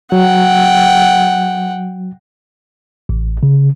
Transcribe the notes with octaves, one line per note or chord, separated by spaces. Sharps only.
F#3 F#5 G5
A1
C#3